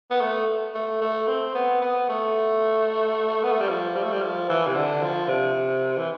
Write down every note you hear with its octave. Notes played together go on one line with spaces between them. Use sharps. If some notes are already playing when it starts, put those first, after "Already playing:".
B3
A3
A3
A3
C4
B3
B3
A3
B3
A3
G3
F3
G3
A3
G3
F3
E3
C3
D3
F3
C3
E3